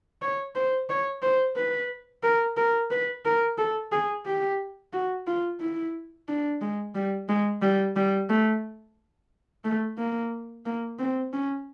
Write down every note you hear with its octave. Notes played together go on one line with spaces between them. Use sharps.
C#5
C5
C#5
C5
B4
A#4
A#4
B4
A#4
A4
G#4
G4
F#4
F4
E4
D4
G#3
G3
G#3
G3
G3
A3
A3
A#3
A#3
C4
C#4